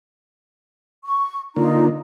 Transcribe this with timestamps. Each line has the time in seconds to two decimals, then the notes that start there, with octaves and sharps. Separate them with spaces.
1.04 C#6
1.56 D3 A#3 D#4 F4 A#5